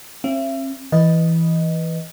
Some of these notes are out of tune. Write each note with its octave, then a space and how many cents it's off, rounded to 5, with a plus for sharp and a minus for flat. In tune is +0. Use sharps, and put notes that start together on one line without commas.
C4 +45 E5 +35
E3 +0 B4 +0 D#5 +0